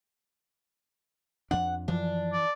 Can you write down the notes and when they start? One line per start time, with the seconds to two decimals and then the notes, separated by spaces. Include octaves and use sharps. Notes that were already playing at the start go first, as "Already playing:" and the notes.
1.51 F2 F3 D4 F#5
1.88 F#2 E3 F3 D4
2.33 D5